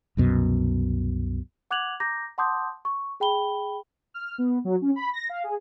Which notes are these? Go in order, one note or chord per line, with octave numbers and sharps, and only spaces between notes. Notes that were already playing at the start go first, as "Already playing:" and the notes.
C2 F#2 B2
F#5 D6 F#6 G#6 F7 F#7
A#5 D6 G6 A#6
F#5 A5 C6 D6 D#6 G6
C#6
G#4 G5 B5 G7
F6
B3
F#3
C#4
B5
A#6
F5
G#4